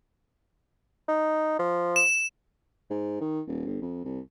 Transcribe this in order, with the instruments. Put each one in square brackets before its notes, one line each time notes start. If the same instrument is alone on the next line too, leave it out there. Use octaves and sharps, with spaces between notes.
[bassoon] D#4
F3
[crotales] E7
[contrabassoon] G#2
D#3
D#1
G1
F2
C2